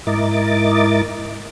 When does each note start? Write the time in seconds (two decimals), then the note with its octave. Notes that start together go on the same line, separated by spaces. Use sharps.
0.07 G#2 E4 A#4 D#5 D6 A6